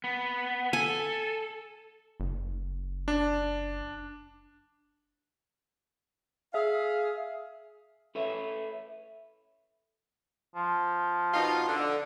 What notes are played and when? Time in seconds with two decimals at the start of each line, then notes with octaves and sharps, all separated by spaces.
0.04 B3
0.73 A4 G#5
2.20 F#1
3.08 D4
6.54 G#4 E5 F5
8.15 A4 B4 C#5 E5
10.56 F3
11.34 B2 D#4 F4
11.67 D3